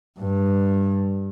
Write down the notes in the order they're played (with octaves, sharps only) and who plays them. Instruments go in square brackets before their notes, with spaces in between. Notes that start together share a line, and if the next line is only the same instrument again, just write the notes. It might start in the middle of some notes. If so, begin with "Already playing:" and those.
[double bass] G2